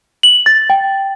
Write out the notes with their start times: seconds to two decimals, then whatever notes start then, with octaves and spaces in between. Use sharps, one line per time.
0.23 F#7
0.46 A6
0.70 G5